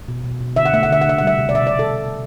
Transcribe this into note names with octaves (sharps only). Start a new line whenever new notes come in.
B2
B2
B2
D3 E5
F#5
A3 E5
F#5
D3 E5
F#5
C3 E5
F#5
G3 E5
C3
D5
B2 E5
D5
B2
A4